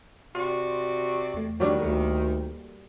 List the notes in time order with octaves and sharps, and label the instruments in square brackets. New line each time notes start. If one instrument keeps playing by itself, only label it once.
[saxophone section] C3 F#4 D5 [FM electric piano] C6
[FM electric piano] E2 A3
[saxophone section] D#3 [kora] F#3 G3 D4
[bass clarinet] D2 [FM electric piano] A#3 A4